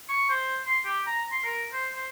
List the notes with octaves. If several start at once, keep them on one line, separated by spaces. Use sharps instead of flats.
C#6
C5
C6
G4
A#5
C6
A#4
C5
C5